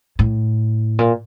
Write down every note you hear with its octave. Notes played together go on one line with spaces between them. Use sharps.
A2
A#2